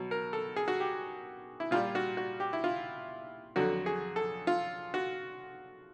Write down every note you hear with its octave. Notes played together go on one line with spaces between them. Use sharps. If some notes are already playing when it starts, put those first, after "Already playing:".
Already playing: B2 F#3
A#4
A4
G#4
F#4
G4
E4
A#2 G3 F4
F#4
F#4
G4
E4
F4
F2 D3 F#3 F#4
G#4
A4
F4
F#4